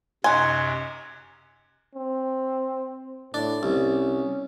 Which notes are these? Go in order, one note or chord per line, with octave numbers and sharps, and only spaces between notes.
F#2 C3 D#4 G#5 C6 F#6 G#6
C4
A2 D4
C2 C#4